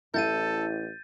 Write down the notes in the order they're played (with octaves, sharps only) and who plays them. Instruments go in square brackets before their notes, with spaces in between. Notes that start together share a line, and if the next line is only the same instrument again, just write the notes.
[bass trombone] A1 [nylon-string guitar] E4 F5 [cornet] A4 [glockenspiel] G6 A6 D#7